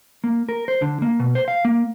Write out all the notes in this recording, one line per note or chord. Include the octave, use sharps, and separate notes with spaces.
A#3
A#4
C5
D3
A#3
B2
C5
F5
A#3